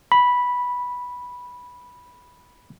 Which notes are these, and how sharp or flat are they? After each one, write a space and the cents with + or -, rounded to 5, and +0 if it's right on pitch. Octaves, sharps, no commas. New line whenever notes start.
B5 -5